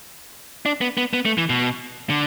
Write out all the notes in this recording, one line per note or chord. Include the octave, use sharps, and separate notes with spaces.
D4
B3
B3
B3
A3
E3
B2
D3